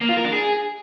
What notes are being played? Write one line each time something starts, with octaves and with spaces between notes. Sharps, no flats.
A#3
F4
A#4
D4
G#4